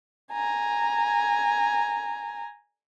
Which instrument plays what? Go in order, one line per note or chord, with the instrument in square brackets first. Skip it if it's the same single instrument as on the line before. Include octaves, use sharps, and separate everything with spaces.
[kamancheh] G#5 A#5